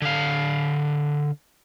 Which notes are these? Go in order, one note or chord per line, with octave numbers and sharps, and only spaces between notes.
D3 F5